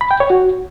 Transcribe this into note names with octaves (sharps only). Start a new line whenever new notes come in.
B5
G5
C#5
F#4